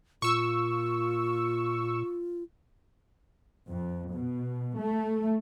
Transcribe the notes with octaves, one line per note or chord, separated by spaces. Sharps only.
A#2 F4 C#6 E6
F2
B2
A3